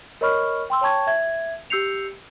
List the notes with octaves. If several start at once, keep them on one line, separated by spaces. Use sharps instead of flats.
A#4 C#5 D#5 B5 C#6 F6
G5 C6 E6
C#5 G5 A5 C#6 G#6
E5 G#6
G4 E6 G6 C7 C#7 F7